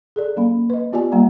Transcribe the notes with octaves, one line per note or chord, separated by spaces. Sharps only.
G#4 A4 D5
F#3 A#3 C#4 F5 B5
B4 D#5
B3 F4 G4 D5 G#5
F#3 G3 A#3 F#5 A#5